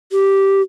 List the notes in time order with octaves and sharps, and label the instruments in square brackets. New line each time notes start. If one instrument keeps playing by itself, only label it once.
[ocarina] G4